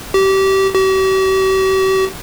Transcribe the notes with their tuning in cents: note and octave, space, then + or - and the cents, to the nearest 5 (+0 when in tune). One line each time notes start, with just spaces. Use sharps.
G4 -25
G4 -45